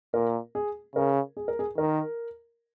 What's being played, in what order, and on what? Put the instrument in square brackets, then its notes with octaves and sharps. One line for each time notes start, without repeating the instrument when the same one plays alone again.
[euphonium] A#2 [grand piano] A#4
[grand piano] G#4
[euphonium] C#3 [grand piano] A#4
[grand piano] G#4
A#4
G#4
[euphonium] D#3 [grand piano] A#4